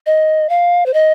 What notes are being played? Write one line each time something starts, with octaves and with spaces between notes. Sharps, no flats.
D#5
F5
C5
D#5